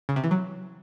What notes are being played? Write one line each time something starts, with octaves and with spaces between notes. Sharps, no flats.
C#3
C3
E3
F#3